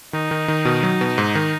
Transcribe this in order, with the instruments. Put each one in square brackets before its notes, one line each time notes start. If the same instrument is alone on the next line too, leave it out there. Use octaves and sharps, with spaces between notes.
[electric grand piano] D#3 [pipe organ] D#4
[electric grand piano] D#3
D#3
B2
F#3
B2
G#2
D#3